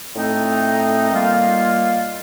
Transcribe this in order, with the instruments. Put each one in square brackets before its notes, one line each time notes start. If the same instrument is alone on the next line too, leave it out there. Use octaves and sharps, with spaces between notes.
[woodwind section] A2 A3 C4 D#4 A4
D#3 G3 A#3 F4